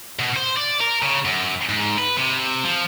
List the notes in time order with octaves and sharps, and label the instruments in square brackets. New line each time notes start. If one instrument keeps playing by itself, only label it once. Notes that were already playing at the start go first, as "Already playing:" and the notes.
[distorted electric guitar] B2
C5
D5
A#4
C#3
F#2
G#2
B4
C3
F3